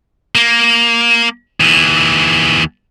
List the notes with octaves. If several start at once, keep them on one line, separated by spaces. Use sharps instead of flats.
A#3
D#2 E3